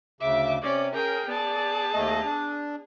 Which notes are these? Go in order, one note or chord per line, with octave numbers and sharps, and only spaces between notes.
D2 C#3 E5 D6
C3 C#4 D5
C#4 G#4 A#4 G5
B3 D5 A5
D#2 A3 D#5
D4